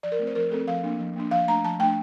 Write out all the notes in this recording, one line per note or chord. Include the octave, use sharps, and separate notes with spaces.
F3 D5
A#4
A3 C4
C5
F3 A#4
A3 C4 A4
F3 F5
A#3 D4
F3
A#3 D4
F3 F5
A3 D4 A#5
F3 A5
A3 D4 G5